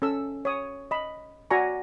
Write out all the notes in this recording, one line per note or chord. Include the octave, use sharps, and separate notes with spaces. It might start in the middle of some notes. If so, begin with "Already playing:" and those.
C#4 A4 E6
C#5 D#6
D#5 B5
F#4 D5 G#5 A#5 C#6